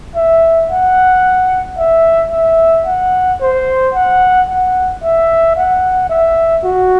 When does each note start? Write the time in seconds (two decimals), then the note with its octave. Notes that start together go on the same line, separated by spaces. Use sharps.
0.16 E5
0.71 F#5
1.78 E5
2.32 E5
2.86 F#5
3.40 C5
3.94 F#5
4.48 F#5
5.03 E5
5.56 F#5
6.10 E5
6.64 F#4